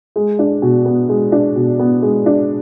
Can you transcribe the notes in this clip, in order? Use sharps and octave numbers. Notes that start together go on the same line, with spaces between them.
G#3
D4
B2
B3
G#3
D4
B2
B3
G#3
D4